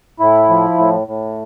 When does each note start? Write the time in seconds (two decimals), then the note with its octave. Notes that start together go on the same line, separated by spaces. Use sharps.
0.20 A2 E4
0.49 F3
0.78 A2
1.07 A2